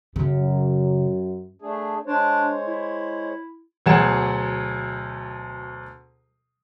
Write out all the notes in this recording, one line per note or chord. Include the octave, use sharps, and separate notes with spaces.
F#2 C#3 F#3
A3 D4 G#4
G#3 D4 C5 C#5
E4
D2 B2 F#3 G#4 F#5 E7